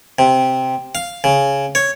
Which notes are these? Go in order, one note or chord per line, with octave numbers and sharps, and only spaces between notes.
C3
F5
C#3
C#5